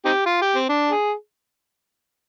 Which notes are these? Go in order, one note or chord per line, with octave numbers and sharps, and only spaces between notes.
C4 D#4 G4
F4
G4
C4
D4
G#4